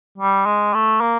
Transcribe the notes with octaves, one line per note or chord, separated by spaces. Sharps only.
G3
G#3
A3
A#3